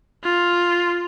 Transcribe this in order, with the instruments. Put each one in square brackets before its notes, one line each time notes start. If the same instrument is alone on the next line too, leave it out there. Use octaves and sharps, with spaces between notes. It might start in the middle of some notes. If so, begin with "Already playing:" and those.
[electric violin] F4